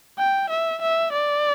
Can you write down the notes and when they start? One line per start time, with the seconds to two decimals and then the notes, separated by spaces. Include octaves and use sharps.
0.18 G5
0.50 E5
0.82 E5
1.13 D5